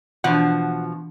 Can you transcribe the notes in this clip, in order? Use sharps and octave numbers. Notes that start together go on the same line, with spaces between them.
B2 E3 F3 D4 F#5